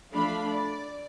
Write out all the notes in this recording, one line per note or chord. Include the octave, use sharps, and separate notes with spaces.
F3 A3 D4 F5 B5
D5